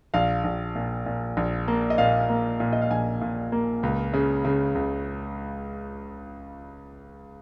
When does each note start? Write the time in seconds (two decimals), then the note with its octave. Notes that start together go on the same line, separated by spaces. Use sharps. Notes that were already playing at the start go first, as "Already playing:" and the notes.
0.14 A#1 F5
0.44 A#1
0.75 A#2
1.06 A#2
1.37 A#1
1.68 A#3
1.90 D#5
1.98 A#2 F5
2.29 A#3
2.60 A#2
2.73 D#5
2.82 F5
2.90 A#1 G#5
3.21 A#2
3.52 A#3
3.83 C#2
4.14 C#3
4.45 C#3
4.75 C#2